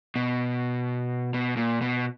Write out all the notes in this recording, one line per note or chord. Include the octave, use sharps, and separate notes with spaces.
B2
B2
A#2
B2